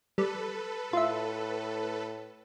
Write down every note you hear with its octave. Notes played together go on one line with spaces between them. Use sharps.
G3 A4 B4
A2 F4 E5